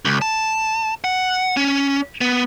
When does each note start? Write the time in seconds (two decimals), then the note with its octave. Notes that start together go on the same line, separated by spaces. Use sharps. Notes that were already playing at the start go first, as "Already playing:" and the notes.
0.05 C#2
0.22 A5
1.04 F#5
1.57 C#4
2.21 B3